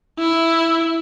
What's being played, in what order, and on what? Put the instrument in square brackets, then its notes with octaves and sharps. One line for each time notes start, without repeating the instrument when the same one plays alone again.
[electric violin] E4